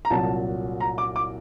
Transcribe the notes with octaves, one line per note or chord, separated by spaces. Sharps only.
A#5
C2 A#2 F#3 A5
A#5
D6
D6